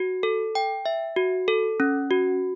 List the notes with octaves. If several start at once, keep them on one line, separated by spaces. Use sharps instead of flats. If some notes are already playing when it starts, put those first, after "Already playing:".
Already playing: F#4
A4
G5
E5
F#4
A4
C#4
F#4